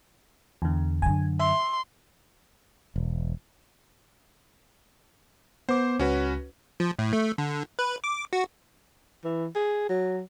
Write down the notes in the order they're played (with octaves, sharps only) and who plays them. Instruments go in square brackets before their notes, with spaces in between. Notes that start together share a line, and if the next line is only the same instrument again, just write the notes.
[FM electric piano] E2 D3
[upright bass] F#2 D3 [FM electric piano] G#5
[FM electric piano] E5 [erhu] C6
[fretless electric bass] E1
[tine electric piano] B3 D6 [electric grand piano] C5
[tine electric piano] C#2 [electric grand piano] C#4 F#4 B4
[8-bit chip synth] F3
A2
A3
D3
B4
D6
F#4
[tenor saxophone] E3
G#4
F#3